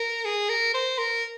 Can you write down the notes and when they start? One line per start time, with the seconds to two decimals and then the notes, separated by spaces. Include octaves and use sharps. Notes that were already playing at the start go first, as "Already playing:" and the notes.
Already playing: A#4
0.25 G#4
0.49 A#4
0.74 C5
0.99 A#4